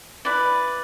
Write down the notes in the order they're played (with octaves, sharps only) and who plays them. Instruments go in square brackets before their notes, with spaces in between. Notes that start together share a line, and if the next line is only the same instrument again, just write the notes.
[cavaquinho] E4 B4 D5